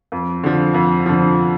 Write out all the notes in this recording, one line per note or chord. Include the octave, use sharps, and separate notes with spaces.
F2
D3 F3
F2
D3 F3